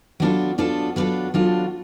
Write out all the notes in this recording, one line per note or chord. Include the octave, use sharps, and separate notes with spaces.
F#3 B3 D4 F4 A4
F#3 B3 D4 F4 A4
F#3 B3 D4 F4 A4
F#3 B3 D4 F4 A4